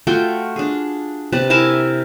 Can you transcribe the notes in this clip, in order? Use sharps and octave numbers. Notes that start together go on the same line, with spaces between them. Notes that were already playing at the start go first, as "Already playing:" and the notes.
A3 F4 F#4 G5
D4 G#4
C3 B4 D5 A5
E4 A#4 G#5 A5